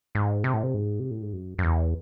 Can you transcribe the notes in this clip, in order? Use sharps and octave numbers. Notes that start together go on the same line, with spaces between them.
G#2
C3
A2
C3
G#2
C3
A2
G#2
F#2
F#2
E2